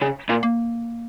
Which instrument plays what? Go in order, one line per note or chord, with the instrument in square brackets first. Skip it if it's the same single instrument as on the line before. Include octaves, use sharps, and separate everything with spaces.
[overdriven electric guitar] C#3
A#2
[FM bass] A#3